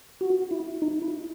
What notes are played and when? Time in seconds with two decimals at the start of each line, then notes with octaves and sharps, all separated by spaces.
0.21 F#4
0.51 E4
0.82 D#4
1.02 E4